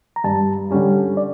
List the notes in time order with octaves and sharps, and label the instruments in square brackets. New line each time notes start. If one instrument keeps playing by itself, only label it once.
[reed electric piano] A#5
[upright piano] G2 [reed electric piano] A5
[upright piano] D3 G3 C#4 G4
[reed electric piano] D5